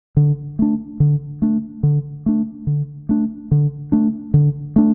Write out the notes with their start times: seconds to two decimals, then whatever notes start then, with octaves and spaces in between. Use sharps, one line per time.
0.17 D3
0.59 A3 D4
1.00 D3
1.42 A3 D4
1.83 D3
2.26 A3 D4
2.67 D3
3.09 A3 D4
3.51 D3
3.92 A3 D4
4.34 D3
4.76 A3 D4